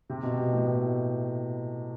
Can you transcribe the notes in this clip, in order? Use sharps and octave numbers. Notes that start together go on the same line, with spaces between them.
C3
B2
B2
A2
B2